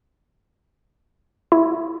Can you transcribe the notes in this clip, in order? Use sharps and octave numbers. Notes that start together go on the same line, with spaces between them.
E4